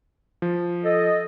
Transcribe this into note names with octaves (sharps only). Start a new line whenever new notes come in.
F3
A4 D#5